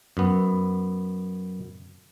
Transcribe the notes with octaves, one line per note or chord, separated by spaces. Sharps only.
F#2 B3